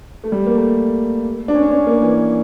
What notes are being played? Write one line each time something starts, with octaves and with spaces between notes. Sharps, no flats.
A3
G3
A#3
A3
D4
C#4
D4
C#4
A#3
E3